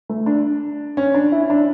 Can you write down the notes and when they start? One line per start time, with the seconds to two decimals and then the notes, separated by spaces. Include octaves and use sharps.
0.09 A3
0.26 D4
0.97 C#4
1.14 D4
1.32 E4
1.50 D4